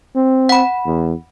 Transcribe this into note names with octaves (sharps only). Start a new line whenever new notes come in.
C4
F#5 B5
E2